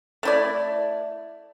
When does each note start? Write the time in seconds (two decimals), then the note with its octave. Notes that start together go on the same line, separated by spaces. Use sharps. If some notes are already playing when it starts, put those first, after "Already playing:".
0.23 A3 E4 D5